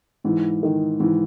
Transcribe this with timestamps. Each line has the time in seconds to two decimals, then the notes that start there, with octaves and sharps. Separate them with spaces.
0.24 G#2 E3
0.63 D#3
1.00 G#2 E3